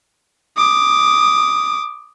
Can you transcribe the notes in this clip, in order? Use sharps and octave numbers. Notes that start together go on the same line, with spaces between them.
D6 D#6